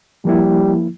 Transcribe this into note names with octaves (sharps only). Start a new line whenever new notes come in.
F3 G3 A#3 E4